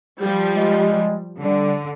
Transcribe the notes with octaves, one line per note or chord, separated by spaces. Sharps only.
F3 G3 G4
G#3
D3 G3